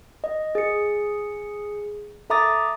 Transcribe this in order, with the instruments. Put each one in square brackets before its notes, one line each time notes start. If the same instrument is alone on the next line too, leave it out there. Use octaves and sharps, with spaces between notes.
[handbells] D#5
G#4 C#7
A4 E5 A#5 D6 D#6 A6